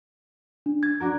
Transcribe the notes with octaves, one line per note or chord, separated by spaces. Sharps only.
D4
G#6 A6
D4 F#4 A#4